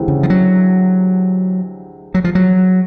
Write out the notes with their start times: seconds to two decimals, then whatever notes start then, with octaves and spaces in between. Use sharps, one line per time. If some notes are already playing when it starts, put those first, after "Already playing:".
Already playing: D2 C3 E3 G#3 C4
0.08 C#3
0.23 F3
0.30 F#3
2.14 F#3
2.24 F3
2.35 F#3